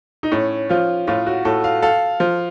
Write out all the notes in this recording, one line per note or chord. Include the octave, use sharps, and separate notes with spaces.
D#4
A2 C#4
F3 F4
A2 F4
F#4
A2 A4
F5
A4 F5
F3